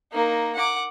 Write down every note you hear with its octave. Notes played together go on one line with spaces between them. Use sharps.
A#3 D#4
F#5 D6